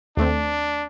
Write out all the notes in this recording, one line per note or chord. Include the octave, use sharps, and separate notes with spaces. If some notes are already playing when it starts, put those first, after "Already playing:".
D#2 A3 C4 D4